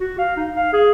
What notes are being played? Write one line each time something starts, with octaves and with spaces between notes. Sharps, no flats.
F#4
F5
D#4
F5
G#4